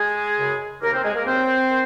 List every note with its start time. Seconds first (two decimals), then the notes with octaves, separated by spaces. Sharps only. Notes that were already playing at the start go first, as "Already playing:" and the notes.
Already playing: G#3 G#4
0.38 F#2 C#3
0.81 D#2 C#3 A#3 A#4
0.92 C4 C5
1.03 G#3 G#4
1.15 A#3 A#4
1.25 D#2 C#3 C4 C5
1.69 D#3